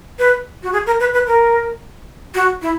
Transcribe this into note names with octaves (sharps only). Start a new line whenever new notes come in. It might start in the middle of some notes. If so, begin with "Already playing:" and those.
B4
F#4
G#4
A#4
B4
B4
A#4
F#4
E4